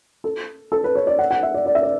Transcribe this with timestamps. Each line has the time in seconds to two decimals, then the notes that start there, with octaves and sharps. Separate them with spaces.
0.24 A4
0.72 A4
0.84 B4
0.95 C#5
1.07 D5
1.19 F#5
1.31 F#5
1.43 E5
1.54 D5
1.66 D5
1.75 E5
1.83 D5